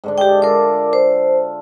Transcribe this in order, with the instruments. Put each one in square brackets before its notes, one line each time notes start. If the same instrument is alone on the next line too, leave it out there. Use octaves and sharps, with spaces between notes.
[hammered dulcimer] G#2 D3 D4
[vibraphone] G4 G5 [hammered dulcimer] G#4 D5 E5
[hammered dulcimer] F4 A4 [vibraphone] A#4 D6
[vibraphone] C5